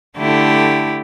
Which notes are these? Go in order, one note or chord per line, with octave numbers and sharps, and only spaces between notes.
D3 A3 E4 G4